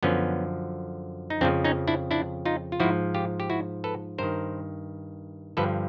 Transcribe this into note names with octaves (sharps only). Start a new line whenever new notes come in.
F#2 D3 F3 B3 C#4
D#4
F2 C#3 F3 C4 D4
C#4 D#4
D4 E4
D4 E4
D#4 F4
F4
G#2 F3 E4 F#4
F4 G4
G4
E4 F#4
A4 B4
G2 D#3 A#4 C5
G2 D3 F3 A4 B4